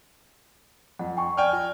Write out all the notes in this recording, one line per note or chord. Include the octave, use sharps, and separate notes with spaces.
F2 F#5
G5 G#5 C#6
D5 G5 G#5 F6
F4